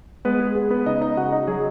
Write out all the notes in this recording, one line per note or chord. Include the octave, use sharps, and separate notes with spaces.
G#3 B3 B4
G#4
B3 G#4
B3 B4
C#3 D#4 D#5
D#4 D#5
C#3 F#4 F#5
D#4 D#5
F#3 G#4